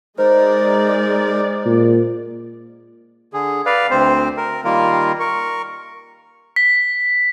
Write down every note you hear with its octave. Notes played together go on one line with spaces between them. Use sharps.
G#3 D#4 A#4 C5 D5
A#2
D3 G#4
B4 D5 F5
D2 C4 C5
A#4
D#3 G3 A#3 F4 A#4
A#4 C#6
B6